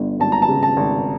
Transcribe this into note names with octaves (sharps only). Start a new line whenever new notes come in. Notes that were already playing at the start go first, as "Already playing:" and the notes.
Already playing: G1 D3
G#1 A5
A#5
A5
C#3
A5
G#1